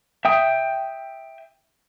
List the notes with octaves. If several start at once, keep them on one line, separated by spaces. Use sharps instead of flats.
E5 G5 D#6